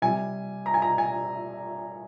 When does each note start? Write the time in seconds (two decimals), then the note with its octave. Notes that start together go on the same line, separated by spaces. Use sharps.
0.02 C3 G3 G#5
0.66 A#5
0.74 G#5
0.82 A#5
0.98 G#5